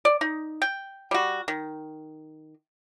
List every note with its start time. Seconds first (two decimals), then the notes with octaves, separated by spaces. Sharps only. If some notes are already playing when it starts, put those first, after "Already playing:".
0.05 D5
0.21 D#4
0.62 G5
1.11 G3 F#4
1.48 D#3